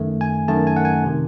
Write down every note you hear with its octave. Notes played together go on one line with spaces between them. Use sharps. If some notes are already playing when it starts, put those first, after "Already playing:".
Already playing: F#2 D#3 A3
G#5
F#2 D#3 A3 A5
G#5
F#5
G#5
C3 D#3